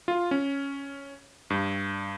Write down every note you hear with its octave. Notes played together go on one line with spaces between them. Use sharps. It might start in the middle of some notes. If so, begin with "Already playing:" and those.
F4
C#4
G2